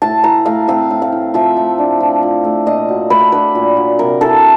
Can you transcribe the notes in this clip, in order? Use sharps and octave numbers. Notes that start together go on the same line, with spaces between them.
A2 A5
E3 A#5
A3 F5
C4 F5
A2
F5
E3
F3 E5
A3
D4
F3
F3
A3
A#2 D#5
F#3
A3 B4
D4 B4
A#2
F#3
C3 A#4
E3 A4